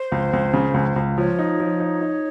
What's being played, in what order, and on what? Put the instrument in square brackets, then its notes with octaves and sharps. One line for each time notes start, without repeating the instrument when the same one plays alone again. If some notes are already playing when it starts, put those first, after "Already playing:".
Already playing: [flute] C5
[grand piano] C#2
C#2
C#3
C#2
C#2
[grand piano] F3 [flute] C#5
[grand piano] D#4
F3
D#4
D#4